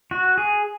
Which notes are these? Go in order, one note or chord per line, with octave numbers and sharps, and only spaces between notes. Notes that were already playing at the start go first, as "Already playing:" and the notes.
F#4
G#4